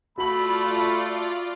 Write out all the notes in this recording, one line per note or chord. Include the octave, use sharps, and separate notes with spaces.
A3 F4 F#4 D5 B5 F#7